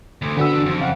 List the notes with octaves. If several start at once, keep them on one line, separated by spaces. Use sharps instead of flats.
D2
D3 F#4 B4 F#5 E6
E2 D4
F2
C#3 F5 F#5